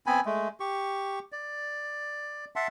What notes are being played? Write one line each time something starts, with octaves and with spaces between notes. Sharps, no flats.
B3 C4 G#5 B5
G#3 A3
G4 C#6
D5
E5 F#5 A5 C6